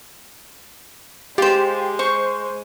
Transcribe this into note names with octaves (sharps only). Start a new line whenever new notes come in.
G#3 F4 G4 C5
C5 C#6